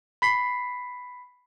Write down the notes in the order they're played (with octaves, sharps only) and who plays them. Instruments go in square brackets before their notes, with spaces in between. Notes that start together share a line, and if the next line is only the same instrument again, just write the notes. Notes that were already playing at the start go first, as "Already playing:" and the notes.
[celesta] B5 B6 C7